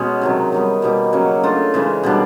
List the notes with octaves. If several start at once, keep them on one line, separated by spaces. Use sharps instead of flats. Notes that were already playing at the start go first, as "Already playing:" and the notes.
Already playing: B2 G#3 B3 C#4
C3 D#3 F#3
D#3 G3 B3
B2 G3 A#3 D#4
C#3 F#3 A#3 C#4
A3 D4 F4
C#3 E3 G#3
B2 G3 A#3 D4